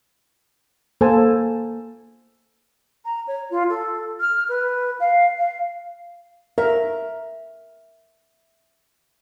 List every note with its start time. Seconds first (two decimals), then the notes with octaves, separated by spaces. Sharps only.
1.01 A#3 A4 C5 G#5 A5
3.04 A#5
3.27 C#5
3.50 F4
3.69 A4
4.19 F6
4.48 B4
4.99 F5
5.37 F5
6.58 A#4 E5